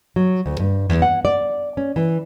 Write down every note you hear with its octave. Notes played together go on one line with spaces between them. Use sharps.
F#3
D2
G2
E2
F#5
D5
C#4
E3